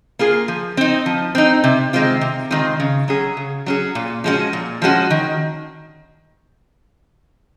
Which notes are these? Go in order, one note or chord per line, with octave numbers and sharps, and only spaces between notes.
A#3 F4 G#4
F3
C4 D#4
F3
C4 D#4
C3
D#3 G#3 C4 F4
C3
D#3 G#3 C4 F4
C#3
F#3 C#4 G#4
C#3
F#3 C#4 G#4
A#2
F3 G#3 C#4 F#4
A#2
F3 G#3 C#4 F#4
D#3